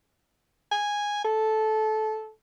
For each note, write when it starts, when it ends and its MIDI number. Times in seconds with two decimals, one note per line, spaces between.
0.72 1.23 80
1.24 2.30 69